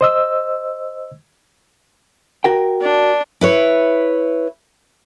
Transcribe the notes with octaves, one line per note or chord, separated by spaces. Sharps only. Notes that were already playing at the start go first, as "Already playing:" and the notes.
C5 D#5 E6
F#4 A#4 G5
D4
E4 B4 C#5